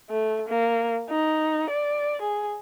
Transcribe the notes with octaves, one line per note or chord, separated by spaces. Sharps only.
A3
A#3
D#4
D5
G#4